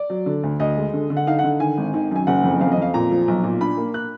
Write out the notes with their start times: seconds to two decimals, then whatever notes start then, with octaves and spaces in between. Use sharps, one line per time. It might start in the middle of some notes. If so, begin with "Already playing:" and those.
Already playing: D5
0.10 F#3
0.26 D3
0.43 D2
0.60 D2 D#5
0.77 G#3
0.94 D3
1.10 D3
1.17 F#5
1.27 D#4 F5
1.39 F#5
1.44 D3
1.60 D#3 G#5
1.77 G#1
1.94 D#3
2.11 F#2 G#5
2.27 F#1 F#5
2.44 F2
2.61 F2 F5
2.72 D#5
2.78 F2 F5
2.94 A#2 A#5
3.11 F3
3.28 B1
3.44 A#2
3.61 D4 B5
3.77 A#3
3.94 F#6